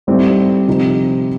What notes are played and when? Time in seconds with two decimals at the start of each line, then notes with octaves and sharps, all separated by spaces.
0.07 A2 G3 C4 D#4 G4
0.67 C3 F3 C4 D#4 G4